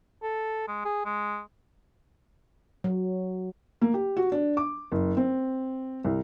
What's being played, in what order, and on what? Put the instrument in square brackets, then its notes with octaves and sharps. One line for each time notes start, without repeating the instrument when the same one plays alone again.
[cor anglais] A4
G#3
G#4
G#3
[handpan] F#3
[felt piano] A#3
G4
F#4
D4
D6
F#1
C4
C2